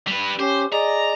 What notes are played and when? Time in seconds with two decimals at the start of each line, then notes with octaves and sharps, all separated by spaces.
0.07 G3 B4
0.39 C#4 G4 C5
0.72 G#4 D5 D#5 A#5